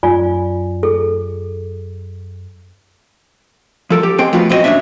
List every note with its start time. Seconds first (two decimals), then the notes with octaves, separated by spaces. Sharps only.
0.03 F#2 F4 D5 G#5
0.83 G#4 A4
3.90 F3 A4 A#4
4.03 G4
4.18 G#2 G#3 C4 G5 C6
4.33 F3 A3 B3 F4 F#4
4.50 F#2 C4 E4 F#4 D#5
4.64 D#2 A#2 G3 C#4 D4 E5